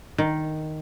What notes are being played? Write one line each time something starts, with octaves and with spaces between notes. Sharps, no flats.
D#3